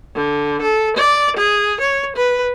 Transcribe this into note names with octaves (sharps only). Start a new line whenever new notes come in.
D3
A4
D5
G#4
C#5
B4